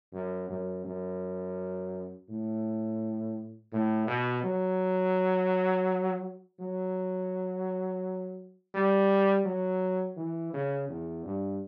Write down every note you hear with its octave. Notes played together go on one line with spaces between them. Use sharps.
F#2
F#2
F#2
A2
A2
B2
F#3
F#3
G3
F#3
E3
C#3
E2
G2